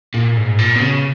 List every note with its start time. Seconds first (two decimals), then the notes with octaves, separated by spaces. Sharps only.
0.14 A#2
0.37 G#2
0.59 A#2
0.76 B2
0.81 C#3